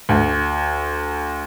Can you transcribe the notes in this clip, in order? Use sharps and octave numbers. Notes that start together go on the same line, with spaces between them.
D2